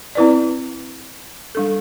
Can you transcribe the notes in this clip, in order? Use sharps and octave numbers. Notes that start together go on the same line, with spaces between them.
C4 E4 B4 D5
G3 D4 A4